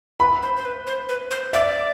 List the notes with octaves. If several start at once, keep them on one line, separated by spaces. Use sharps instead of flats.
B4 B5
C5
C5
B4
C5
B4
C5
D5 E5